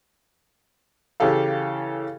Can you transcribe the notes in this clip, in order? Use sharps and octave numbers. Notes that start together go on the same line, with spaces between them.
C#3 E3 G4 A4 F5